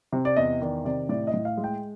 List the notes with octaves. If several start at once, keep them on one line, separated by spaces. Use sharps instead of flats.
C3
D5
E2 D#5
D#3 D5
C3 D5
A2 D5
D#5
A2
F5
G#3
G5